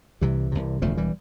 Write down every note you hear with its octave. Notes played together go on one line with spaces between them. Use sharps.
C2 C3 E3 G3
C2 C3
E1 E2 D3 F3 A3
E3 G3